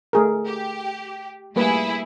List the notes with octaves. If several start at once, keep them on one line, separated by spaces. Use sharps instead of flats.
A3 G#4 A#4
G4
G3 A3 A#3 E4 G#4 B4